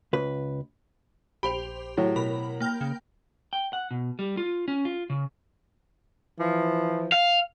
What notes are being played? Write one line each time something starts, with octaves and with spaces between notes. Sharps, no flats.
C#2 B4
A#1 G4 C5 B5 F7
A2 F#3
B2 A#4 B5
A#3 G5 F6
C#3
G5
F#5
B2
G3
F4
C#4
F4
C#3
E3 F3
F5